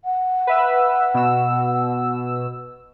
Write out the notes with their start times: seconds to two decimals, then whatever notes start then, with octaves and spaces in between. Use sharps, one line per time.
0.05 F#5
0.47 B4 E5 E6
1.14 B2 E6